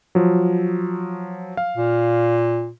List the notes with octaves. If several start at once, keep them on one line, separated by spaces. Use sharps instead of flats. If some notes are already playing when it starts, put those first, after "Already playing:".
F3 F#3
F5
A#2